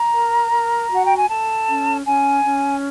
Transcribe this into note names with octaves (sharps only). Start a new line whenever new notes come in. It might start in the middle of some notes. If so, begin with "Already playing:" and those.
Already playing: A#5
A#4
A#4
F#4 F#5
G5
G#5
A4 A5
C#4
C#4 G#5
C#4